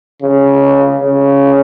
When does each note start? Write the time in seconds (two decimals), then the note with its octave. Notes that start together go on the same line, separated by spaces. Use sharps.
0.22 C#3
1.00 C#3